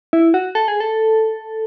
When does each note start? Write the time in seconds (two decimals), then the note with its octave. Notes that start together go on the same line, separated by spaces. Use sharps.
0.13 E4
0.34 F#4
0.55 A4
0.68 G#4
0.80 A4